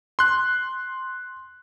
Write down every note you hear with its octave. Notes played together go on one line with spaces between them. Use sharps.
C6 F#6